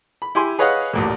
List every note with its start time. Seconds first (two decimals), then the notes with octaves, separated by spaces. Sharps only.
0.22 B5
0.35 E4 G4 G#5 C6
0.58 G#4 B4 C#5 D#5 F5 F#5
0.93 A1 D2 A#2